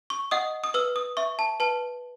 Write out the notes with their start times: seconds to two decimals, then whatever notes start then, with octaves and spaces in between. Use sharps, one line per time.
0.10 C#6
0.31 D#5 F#5 D#6
0.64 D#6
0.74 B4 E6
0.96 D#6
1.17 E5 C#6
1.39 A5
1.60 B4 A5